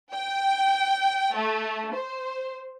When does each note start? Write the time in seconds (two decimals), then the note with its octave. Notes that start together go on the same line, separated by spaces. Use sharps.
0.14 G5
1.35 A3
1.95 C5